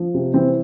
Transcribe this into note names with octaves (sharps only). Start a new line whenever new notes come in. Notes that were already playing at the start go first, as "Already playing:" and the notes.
Already playing: F3
C3
E3 C4